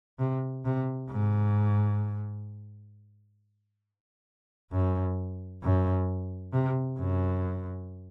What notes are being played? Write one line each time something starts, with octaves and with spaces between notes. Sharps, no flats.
C3
C3
G#2
F#2
F#2
C3
F#2